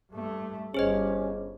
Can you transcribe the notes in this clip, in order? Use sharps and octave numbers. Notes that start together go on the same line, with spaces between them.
G2 A3
G1 G2 C#4 G#4 C5 D#5